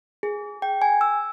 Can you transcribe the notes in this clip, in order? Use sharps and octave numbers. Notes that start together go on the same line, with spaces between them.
G#4
G5
G#5
E6